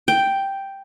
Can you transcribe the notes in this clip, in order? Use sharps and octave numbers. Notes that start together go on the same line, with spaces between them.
G5